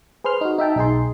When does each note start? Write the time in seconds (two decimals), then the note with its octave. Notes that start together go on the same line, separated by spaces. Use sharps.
0.24 G#4 B4 C5 C6 F6
0.41 D#4 F#4
0.58 D#4 E5 G5 A5
0.76 B1 D#4 G#4 C6